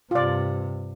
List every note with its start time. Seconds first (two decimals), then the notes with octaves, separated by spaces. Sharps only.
0.11 G2 C3 F4 D5